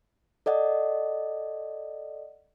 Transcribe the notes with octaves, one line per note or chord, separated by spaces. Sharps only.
A4 D5 D#5 F#5